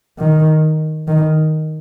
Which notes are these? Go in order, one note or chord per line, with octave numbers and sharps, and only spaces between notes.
D#3
D#3